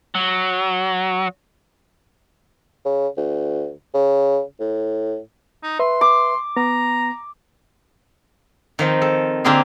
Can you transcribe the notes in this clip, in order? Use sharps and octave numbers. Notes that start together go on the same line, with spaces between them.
F#3
C#3
D2
C#3
A2
D#4
B4 E5 C6
D6
B3 A#5
D#3 F3 C4
A4
D3 A#3 C4 F4 G4 G#4